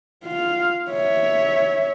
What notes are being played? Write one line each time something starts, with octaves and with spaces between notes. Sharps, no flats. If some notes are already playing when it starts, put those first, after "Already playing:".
F4 F5
C#5 E5